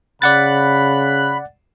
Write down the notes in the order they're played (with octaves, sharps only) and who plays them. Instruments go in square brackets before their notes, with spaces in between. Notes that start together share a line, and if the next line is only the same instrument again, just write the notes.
[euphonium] C#3 [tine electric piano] D5 F#5 A6 [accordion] B5 F#6